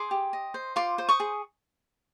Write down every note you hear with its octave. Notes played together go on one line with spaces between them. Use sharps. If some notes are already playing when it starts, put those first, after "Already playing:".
Already playing: G#4 C6 D6
G4
D#5
C5
F4 C6 D6
C5
C#6 D#6
G#4